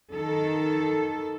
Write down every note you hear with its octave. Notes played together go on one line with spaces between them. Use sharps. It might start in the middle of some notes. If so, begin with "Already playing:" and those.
D#3 A4